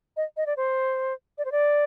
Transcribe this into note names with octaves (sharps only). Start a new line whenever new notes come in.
D#5
D#5
D5
C5
D5
C5
D5